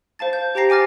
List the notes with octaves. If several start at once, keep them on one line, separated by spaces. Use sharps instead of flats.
C5 F5 A5 A6
G6
G4 C5 G5 A#5 A#6 C7
G5 G#5 D6 F6 A6